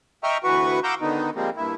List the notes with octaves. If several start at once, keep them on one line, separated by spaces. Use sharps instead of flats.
D#5 E5 G5 A#5 C#6 F6
D2 E3 F#4 B4 C#6
F5 F#5 A#5 D6 E6 G6
D3 D#3 B3 D#4
F3 G3 G#3 A#3 C4
G2 A#2 E4